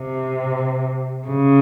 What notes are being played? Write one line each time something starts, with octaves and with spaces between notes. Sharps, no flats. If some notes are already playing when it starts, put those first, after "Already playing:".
Already playing: C3
C#3